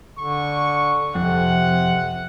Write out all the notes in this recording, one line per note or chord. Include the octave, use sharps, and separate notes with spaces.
D3 C#6
F2 C3 F#5